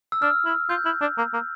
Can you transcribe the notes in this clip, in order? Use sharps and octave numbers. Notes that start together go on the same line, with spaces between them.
E6
D4 F6
E4
F4 G6
E4
D4
A#3
A#3